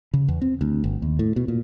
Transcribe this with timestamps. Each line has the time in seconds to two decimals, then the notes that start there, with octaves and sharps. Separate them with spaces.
0.14 C#3
0.28 E2
0.42 C4
0.61 D2
0.84 G1
1.02 D#2
1.19 A2
1.36 B2
1.48 A#2